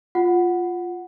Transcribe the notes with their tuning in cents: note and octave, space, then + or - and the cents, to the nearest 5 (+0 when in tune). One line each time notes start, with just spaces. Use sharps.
F4 +0 F#5 +0